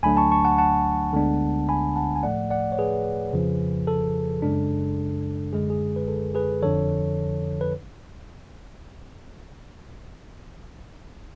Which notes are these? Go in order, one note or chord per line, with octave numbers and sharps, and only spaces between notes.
D2 D3 F#3 A3 D4 G#5 B5
A5 C#6
A5 C#6
F#5 A5
F#5 A5
D2 D3 G#3 B3 D4
G#5 B5
F#5 A5
G#5
A2 F3 A3 D5 F#5
D5 F#5
C#5
G#4 B4
F2 C#3 F3
A4
F#2 C#3 G#3 D4
F#2 D3 G#3 G#4
G#4
B4
A4
G#4 B4
F2 D3 F3 A4 C#5
B4